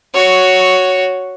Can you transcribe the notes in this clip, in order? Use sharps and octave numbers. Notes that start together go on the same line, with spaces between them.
F#4 C#5